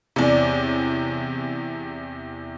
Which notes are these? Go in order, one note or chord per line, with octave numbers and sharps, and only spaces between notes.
E2 C3 C#5 D5